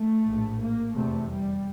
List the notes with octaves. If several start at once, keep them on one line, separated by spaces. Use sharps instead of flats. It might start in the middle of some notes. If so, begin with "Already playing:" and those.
Already playing: A3
A#1 A2
A#3
F1 E2 C3 A3
G3